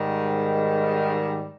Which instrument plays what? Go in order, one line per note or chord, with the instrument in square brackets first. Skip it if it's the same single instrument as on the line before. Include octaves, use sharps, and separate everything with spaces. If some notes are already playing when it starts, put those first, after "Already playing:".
Already playing: [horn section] G#2 D#3 G3